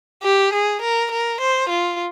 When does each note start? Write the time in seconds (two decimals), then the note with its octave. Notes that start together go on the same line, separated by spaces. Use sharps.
0.23 G4
0.54 G#4
0.82 A#4
1.12 A#4
1.41 C5
1.69 F4